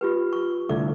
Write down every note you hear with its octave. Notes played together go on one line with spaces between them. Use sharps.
F4 G4 B4
C#6
C2 D3 A3 D5 D6